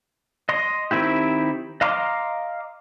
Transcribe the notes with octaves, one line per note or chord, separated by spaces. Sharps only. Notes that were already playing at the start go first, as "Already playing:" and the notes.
D#5 C6
D#3 C4 E4 G4
D#5 F5 A#5 C6 D6